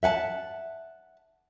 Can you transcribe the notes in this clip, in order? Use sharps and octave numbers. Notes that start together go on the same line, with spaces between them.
E5 F#5 G#5 A5